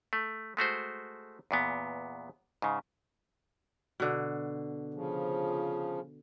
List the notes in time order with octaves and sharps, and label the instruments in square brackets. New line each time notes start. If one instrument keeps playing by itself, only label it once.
[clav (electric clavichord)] A3
G#3 A3 F#4 C5
E2 A#2 B3
G#2 C#3
[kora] B2 D3
[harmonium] C#3 F3